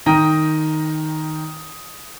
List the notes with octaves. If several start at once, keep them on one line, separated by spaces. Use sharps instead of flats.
D#3 G5 A#5 D#6 A#6